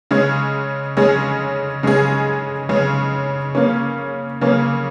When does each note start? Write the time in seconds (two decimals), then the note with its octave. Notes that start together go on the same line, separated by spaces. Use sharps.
0.11 C#3 G#3 C#4 G#4
0.97 C#3 G#3 C#4 G#4
1.83 C#3 G#3 C#4 G#4
2.69 C#3 G#3 C#4 G#4
3.55 C#3 A#3 C#4
4.41 C#3 A#3 C#4